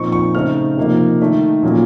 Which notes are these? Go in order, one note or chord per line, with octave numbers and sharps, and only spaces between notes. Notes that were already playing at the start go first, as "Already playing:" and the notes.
Already playing: A#2 F3 C4 D#4 C#6
C#6
C#3 A3 C4 D#4 F6
C3 F3 A#3 D#4
D#3 A3 D#4
A#2 F#3 A#3 C#4